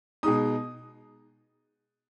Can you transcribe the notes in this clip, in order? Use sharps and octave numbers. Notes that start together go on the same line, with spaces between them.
B2 G#3 D#4 D#6